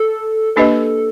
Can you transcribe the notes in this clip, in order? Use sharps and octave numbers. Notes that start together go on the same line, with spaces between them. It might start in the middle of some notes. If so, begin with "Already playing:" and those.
Already playing: A4
A#3 D4 G4 A4 B4 D#5